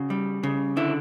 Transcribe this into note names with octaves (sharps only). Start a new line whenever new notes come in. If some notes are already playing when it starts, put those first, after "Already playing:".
Already playing: C#3 F#4
G3
C#3
D3 E4